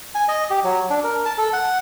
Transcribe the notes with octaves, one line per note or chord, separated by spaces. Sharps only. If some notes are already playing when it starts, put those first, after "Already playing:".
G#5
D#5
G4
F#3
D4
A#4
A5
A4
F#5